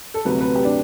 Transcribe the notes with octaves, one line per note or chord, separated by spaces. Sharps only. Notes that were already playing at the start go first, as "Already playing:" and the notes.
A4
D2 C3 F#3 A3 B4
B4
G4
D4